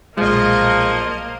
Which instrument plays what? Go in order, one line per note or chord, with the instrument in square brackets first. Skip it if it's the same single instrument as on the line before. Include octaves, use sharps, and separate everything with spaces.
[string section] B1 D#5 [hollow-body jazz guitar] A#2 G#3 [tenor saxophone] F3 [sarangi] A#3